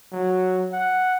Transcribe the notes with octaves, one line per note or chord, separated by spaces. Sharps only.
F#3
F#5